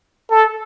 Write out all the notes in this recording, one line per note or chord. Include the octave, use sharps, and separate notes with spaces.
A4